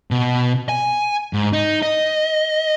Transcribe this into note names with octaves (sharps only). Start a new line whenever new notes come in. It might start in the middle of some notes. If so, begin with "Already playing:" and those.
B2
G#5
G#2
D#4
D#5